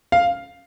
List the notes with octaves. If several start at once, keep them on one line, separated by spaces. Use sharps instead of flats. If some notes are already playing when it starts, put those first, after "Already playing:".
F5